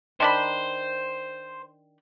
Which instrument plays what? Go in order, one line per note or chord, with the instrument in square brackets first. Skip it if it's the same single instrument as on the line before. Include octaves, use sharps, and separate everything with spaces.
[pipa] D#3 D4 B5 [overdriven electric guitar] C5